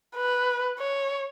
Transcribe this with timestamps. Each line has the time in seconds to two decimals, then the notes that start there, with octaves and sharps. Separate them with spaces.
0.16 B4
0.79 C#5